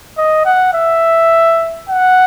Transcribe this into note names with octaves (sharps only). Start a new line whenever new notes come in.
D#5
F#5
E5
F#5